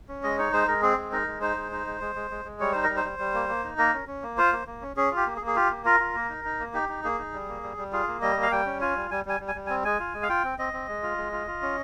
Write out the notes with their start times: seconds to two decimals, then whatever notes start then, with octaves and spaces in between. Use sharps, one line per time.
0.09 C#4
0.23 G#3 D#5
0.38 D#4 C#5
0.53 G#3 C5
0.68 G#3 A#4
0.82 C4 G#4
0.97 G#3
1.12 D#4 A#4
1.27 G#3
1.41 D#4 C5
1.57 G#3
1.72 D#4
1.87 G#3
2.01 G#3
2.15 G#3
2.31 G#3
2.45 G#3
2.60 G3 C#5
2.72 D#4 C5
2.84 A#4
2.89 G3
2.97 C5
3.04 G3
3.19 G3
3.34 A#3
3.49 A#3
3.64 D#4
3.78 A#3 A#4
3.94 C#4
4.07 C#4
4.23 A#3
4.38 F4 C5
4.52 A#3
4.67 A#3
4.82 C#4
4.97 C#4 G#4
5.12 F4 G4
5.27 A#3
5.37 G#4
5.41 A#3
5.47 G#4
5.56 F4 G4
5.71 A#3
5.85 F4 A#4
6.00 F4
6.15 A#3
6.30 D#4
6.45 D#4
6.60 A#3
6.74 D#4 G4
6.89 D#4
7.04 A#3 G#4
7.19 D#4
7.33 G3
7.48 A#3
7.63 G3
7.78 G3
7.93 F4 G#4
8.07 A#3
8.22 G3 D#5
8.37 A#3
8.42 F5
8.52 G3 G5
8.66 C#4
8.81 F4 G#5
8.96 G3
9.11 G3 G#5
9.25 G3 G#5
9.40 G3
9.48 G#5
9.55 G3
9.67 C4 G#5
9.85 G#3 G#5
10.00 F4
10.14 G#3
10.23 F5
10.29 F4 G5
10.44 C4
10.59 C4 D#5
10.73 C4
10.88 G#3
11.03 F4
11.18 G#3
11.32 F4
11.47 F4
11.62 C#4